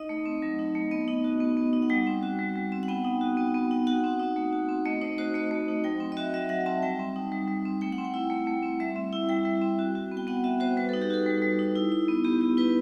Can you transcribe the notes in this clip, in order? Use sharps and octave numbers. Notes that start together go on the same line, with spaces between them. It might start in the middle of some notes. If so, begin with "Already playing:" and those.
Already playing: D#4 D#5
A3
C4
F#3
D#4
A3
B3 D#5
D#4
F#4
B3
B3
D#4
F#5
G3 G5
C4
F#4
G3
G3
C4
F#5
B3 G5
D#4
F#4
B3
B3
D#4
F#4 F#5
C4
D#4
A3
F#4
C4
A3 D#5
D#4 C5
F#4 C5
A3 D#5
A3
D#4
F#3 G5
C4
D#5
F#4 E5
F#3 E5
F#3 F#5
C4 A5
G3 G5
C4
D#4
G3
G3
C4
A3 G5
F#5
C4
G5
E4
A3
A3
C4
G3 E5
C4
E4
G3 G5
G3
C4
F#4
F#4
B3
G5
B3 F#5
F#4 E5
F#4 C5
G3 B4
A4
D#4
G4
F#4 A4
G3
G3
D#4
E4
E4
B3
B3 G4
E4 G4
E4 B4